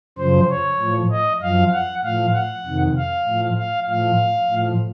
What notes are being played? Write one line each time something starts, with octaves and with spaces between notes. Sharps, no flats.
F#2 C#3 F3 C5
C#5
A2 F3
D#5
F#2 F3 F5
F#5
A2 F3 F5
F#5
F2 C3 D#3
F5
A2 F3
F5
A2 F3 F5
A2 F3